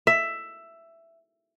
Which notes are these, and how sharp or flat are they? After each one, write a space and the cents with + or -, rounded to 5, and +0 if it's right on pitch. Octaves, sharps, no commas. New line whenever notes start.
E5 +10